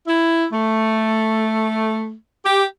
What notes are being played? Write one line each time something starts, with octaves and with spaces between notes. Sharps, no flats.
E4
A3
G4